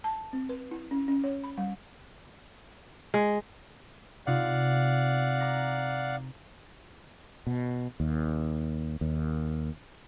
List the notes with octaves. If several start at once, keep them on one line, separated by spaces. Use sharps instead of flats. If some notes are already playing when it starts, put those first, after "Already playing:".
A5
C4
B4
E4
C#4
C#4
C#5
B5
G3
G#3
C3 D#4 F4 D5 F5 F#5
A#5 D6 A#6
B2
D#2
D#2